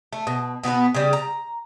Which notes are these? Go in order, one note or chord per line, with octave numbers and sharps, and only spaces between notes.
A3
B2
B2 B3 E4 B4
C#3 G3
A#5